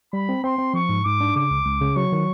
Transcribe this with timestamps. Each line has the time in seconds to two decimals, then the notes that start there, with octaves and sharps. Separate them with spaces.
0.13 G3 B5
0.29 C4
0.44 C4 C6
0.58 C4
0.74 F3 C#6
0.89 G#2
1.05 G#2 D6
1.21 D4
1.36 C#3 D6
1.50 C#2
1.65 C#2
1.81 C#3
1.96 F#3 C#6
2.12 D#3